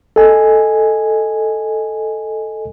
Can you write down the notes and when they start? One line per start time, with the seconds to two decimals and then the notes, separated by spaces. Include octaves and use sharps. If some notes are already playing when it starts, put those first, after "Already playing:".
0.16 A4 D#5 G#5